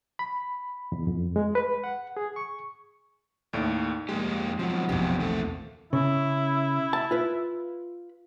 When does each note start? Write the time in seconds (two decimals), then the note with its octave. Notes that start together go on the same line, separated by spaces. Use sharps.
0.19 B5
0.92 E2
1.07 F2
1.36 G#3
1.55 B4
1.84 F#5
2.17 G#4
2.36 C#6
3.53 D#2 A2 D#4 D5
4.09 F2 G#3 A#3 G4
4.59 F3 F#3 B3 C4
4.89 A#1 E2 F#3 B3 G4
5.20 D#3 A3 A4
5.93 C#3 E4
6.93 A5
7.11 F4 B4